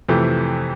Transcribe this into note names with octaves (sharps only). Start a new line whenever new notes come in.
F2 C3 E3 A3